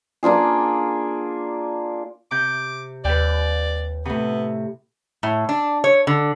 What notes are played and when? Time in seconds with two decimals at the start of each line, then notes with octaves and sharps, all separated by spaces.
0.23 A#3 D4 F4 G#4
2.31 C3 D6 G6
3.05 D#2 B4 D5 G5
4.05 A2 C3 B3
5.23 A2
5.49 D4
5.84 C#5
6.07 D3